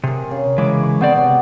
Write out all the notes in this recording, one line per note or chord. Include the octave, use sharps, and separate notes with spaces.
C3 G#4 A#4
C#3
C#3 E3 G#3 D6
C#6
C#3 B3 C4 D5
C3 D5